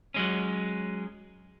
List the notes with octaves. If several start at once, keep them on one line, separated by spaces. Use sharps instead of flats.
F#3 G#3 C#4